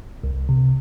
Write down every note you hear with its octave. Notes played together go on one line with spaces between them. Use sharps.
C2
C3